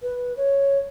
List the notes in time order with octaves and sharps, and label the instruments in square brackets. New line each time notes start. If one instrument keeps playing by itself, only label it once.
[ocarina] B4
C#5